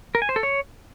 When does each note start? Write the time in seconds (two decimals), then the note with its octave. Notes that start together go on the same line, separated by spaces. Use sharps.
0.15 A#4
0.22 G#5
0.29 C5
0.36 A4
0.43 C#5